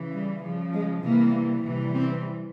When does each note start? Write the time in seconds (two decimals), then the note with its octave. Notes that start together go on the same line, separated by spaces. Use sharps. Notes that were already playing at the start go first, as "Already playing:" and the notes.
Already playing: C#3 E3
0.13 G3
0.43 C#3 F3
0.73 G#3
1.03 C3 E3 G3 A#3
1.64 C3 E3 G3
1.94 C4